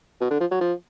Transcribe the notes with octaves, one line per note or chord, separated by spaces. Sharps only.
B2
D3
F3
F#3
F3